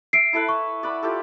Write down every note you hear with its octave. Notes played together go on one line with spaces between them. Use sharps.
E5 C7 D7
E4 A4 B4
C#6
D5 F#5 B5
F4 G4 A4